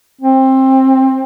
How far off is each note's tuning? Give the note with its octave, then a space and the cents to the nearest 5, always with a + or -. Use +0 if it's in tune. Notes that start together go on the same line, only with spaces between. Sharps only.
C4 +20